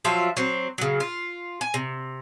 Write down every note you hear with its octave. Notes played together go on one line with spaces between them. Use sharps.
F3 F#3 F4 E5
F#3 C4
C#3 F#3
F4
G#5
C3